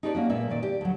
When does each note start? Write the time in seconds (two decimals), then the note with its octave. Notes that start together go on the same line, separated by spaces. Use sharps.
0.03 D#4 G4 A4 B4 C5 D5
0.15 A#3 C#4 F#4
0.30 A#2 G#3 A#3 B3 E5
0.50 A#2 D#3 D5
0.63 G4
0.81 D2 F#3